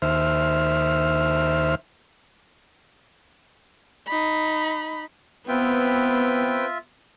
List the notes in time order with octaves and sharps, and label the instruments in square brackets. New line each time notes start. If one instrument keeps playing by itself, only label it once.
[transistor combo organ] D#2 C5 E5 F6
[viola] D#4 B5
[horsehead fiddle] B3 [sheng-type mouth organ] C4 B4 G5 [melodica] F4 E5